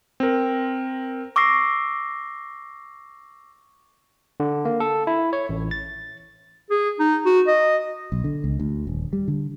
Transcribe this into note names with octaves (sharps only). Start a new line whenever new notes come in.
C4 A#4
C#6 D6 E6 A#6 C7
D3
A#3
A4
E4
C#5
A1
A6
G#4
D#4
F#4
D#5
B1
D3
C#2
D2
D#1
G3
D3